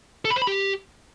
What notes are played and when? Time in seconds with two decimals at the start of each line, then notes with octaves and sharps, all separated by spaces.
0.25 A4
0.30 B5
0.36 C5
0.42 B5
0.47 G4